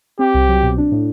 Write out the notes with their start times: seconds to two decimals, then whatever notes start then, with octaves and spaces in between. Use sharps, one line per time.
0.19 C4 G4
0.34 C2
0.49 F#3
0.63 B2
0.78 D4
0.92 A2